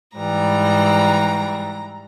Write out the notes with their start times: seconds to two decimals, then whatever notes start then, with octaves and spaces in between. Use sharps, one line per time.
0.16 G#2 E3 G3 A#5